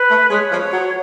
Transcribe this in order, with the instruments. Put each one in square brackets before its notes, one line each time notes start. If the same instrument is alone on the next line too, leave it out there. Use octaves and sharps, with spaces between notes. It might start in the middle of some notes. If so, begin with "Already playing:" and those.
Already playing: [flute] B4
[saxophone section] A3
[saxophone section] G#3 [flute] C#5
[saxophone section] F3
F#3